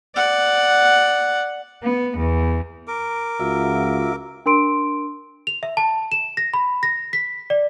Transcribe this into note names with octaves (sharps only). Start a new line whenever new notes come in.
D5 F#5
B3
E2
A#4 D6
C#2 F4 F#4 E5
D4 A#4 C6 D7
F7
E5
A5
E7
A#6
B5
A#6
B6
D5